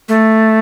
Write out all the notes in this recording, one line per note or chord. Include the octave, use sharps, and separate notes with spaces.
A3